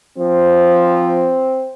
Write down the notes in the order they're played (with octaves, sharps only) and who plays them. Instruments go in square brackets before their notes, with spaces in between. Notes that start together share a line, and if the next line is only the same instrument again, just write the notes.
[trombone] F3 [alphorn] C4